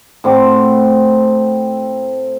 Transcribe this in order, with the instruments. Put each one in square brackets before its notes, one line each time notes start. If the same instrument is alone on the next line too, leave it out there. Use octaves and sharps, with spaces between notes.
[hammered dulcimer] A2 C4 F#5 D6